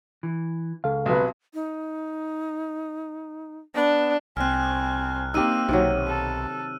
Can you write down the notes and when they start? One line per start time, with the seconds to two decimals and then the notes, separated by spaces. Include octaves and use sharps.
0.23 E3
0.84 C#2 A4 F5
1.06 B1 C3 F#3 B4
1.54 D#4
3.75 B3 D4
4.37 C2 C4 G#5 F6 F#6
5.34 A#3 C4 D#4 G4 E6 D#7
5.69 B1 C3 D#3 F#3
6.08 A4